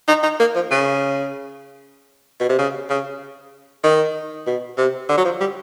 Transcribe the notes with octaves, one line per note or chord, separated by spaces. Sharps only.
D#4
D#4
A#3
F3
C#3
B2
C3
C#3
C#3
D#3
B2
C3
D3
F#3
F3
G3